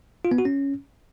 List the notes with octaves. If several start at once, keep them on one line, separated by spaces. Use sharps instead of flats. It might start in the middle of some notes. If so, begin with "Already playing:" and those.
F4
B3
F#4
C#4